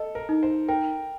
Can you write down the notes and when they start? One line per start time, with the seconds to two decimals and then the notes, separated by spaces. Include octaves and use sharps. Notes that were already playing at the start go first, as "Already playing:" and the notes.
Already playing: A4 D#5
0.15 A#4
0.29 D#4
0.43 C5
0.68 A#4 G5